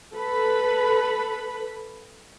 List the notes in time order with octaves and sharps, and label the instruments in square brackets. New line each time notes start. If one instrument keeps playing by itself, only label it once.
[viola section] A4 B4 B5